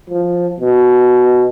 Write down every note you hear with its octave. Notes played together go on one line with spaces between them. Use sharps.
F3
B2